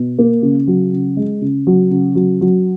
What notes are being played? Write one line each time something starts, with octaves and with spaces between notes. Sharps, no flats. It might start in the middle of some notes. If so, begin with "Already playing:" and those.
Already playing: B2
A#3
C#3
F#3
C#3
G#3
C#3
F#3
C#3
F#3
F#3